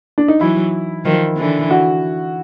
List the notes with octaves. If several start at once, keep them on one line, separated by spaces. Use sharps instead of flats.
D4
D#4
E3 F#3 E4
D#3 F3
D3 E3
F#4